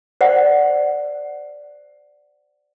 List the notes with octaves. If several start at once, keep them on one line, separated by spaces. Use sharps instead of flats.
C5 D5 F#5